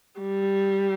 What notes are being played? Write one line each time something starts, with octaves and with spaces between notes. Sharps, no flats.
G3